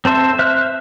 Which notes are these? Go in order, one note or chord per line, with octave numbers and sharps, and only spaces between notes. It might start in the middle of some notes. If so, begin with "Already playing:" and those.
C4 A4 C5 E5
C5 E5 F6 F#6